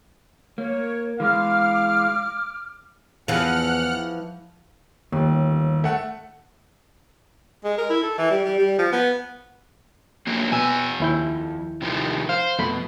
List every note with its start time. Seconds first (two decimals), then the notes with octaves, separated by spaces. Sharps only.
0.58 A#3 C#5
1.20 E3 G#3 F5 D6 F6
3.28 E2 E3 F3 F#5 F6 F#6
5.12 G1 D#2
5.84 A3 F#5
7.64 G#3
7.78 A#4
7.89 E4
8.03 A4
8.18 E3
8.30 G3
8.44 G3
8.58 G3
8.78 F3
8.92 B3
10.27 F3 F#3 A#3
10.52 F2 B2 G#5 E6
11.00 D#2 E4 G6
11.82 C3 D#3 F3
12.29 C5 F5
12.59 F2 B2 A3 B5